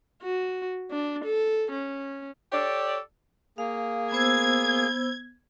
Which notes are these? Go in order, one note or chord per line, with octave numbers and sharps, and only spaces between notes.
F#4
D4
A4
C#4
G4 A4 C#5 D5
A#3 G#4 F5
B3 C5 E6 G#6